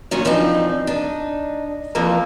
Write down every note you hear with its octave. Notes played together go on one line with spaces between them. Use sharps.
A#2 D#3 F#3 C#4
E3 F3 C4 D4 D#4
D4 D#4
F2 E3 F3 A3 A#3 A#5